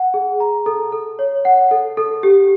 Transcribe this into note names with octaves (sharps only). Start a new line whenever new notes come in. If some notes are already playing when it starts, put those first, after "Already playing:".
Already playing: F#5
G#4
A#5
A4
A4
C#5
F#5
A4
A4
G4